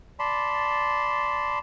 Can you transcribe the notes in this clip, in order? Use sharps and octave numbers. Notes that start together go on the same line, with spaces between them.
D5 A5 B5 C6